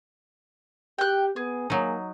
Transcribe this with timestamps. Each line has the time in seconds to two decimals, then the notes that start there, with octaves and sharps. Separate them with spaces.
0.98 G4 G5 F#6
1.36 B3 G#4
1.70 F#3 A#3 D#4